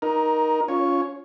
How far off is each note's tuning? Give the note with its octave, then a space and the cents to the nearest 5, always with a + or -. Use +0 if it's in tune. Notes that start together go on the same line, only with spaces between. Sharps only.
D#4 +0 A#4 +20
C#4 +25 F4 +0 C#5 +0